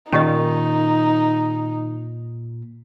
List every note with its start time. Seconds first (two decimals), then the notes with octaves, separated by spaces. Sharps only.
0.12 A#2 D#3 C#4 D#4 G4 D#5